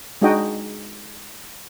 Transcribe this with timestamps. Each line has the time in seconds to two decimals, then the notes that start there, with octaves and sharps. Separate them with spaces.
0.22 G#3 D4 D#4 F#4 D#5 G5